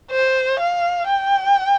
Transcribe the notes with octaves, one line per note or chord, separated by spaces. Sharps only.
C5
F5
G5